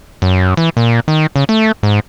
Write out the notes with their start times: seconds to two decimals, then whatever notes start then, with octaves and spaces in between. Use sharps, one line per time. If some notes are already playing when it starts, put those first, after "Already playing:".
0.22 F#2
0.57 E3
0.77 A#2
1.08 D#3
1.36 C#3
1.49 A3
1.83 G#2